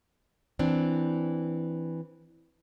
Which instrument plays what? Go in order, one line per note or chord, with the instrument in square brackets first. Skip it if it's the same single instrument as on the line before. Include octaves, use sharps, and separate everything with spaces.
[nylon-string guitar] E3 C4 D4